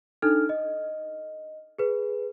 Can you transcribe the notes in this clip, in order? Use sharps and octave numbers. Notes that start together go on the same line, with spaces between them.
D4 D#4 A4 F6
D#5
G#4 B4